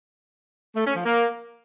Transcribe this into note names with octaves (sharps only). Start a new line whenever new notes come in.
A3
C#4
F3
A#3